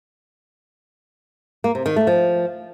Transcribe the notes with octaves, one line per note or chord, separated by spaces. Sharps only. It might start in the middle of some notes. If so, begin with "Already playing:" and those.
A#3
C3
D#3
A3
F3